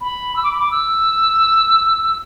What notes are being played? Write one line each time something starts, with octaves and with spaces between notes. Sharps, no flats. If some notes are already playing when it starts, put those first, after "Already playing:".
B5
E6
D6
B5
D6
E6